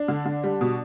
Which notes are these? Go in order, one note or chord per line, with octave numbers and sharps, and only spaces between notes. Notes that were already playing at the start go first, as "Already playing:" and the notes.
Already playing: D4
D3
D3
G3
B2